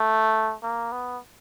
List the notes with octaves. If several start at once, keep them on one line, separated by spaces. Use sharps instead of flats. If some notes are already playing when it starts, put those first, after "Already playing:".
Already playing: A3
A#3
B3